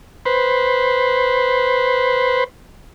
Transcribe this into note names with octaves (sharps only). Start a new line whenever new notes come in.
B4 C5